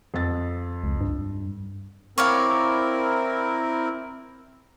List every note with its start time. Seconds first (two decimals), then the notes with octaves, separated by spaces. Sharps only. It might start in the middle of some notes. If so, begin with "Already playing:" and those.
0.14 F2 A6
0.84 C#2
1.01 G2
2.18 C4 E4 A#4 C#5 D5 F5